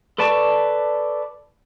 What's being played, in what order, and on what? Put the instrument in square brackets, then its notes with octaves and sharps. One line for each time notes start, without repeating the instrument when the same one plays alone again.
[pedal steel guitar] A4 B4 D5 A5 C#6